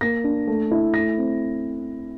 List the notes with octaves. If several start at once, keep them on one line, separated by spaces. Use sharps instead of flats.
A#3 A#6
D4
A3
E4
A3 A#6
C4